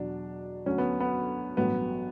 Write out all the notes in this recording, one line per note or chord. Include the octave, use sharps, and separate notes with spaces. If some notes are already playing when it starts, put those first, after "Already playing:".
Already playing: E2 B2 F#3 D4
D2 D3 F#3 C#4
B3
B3
A1 G2 F#3 B3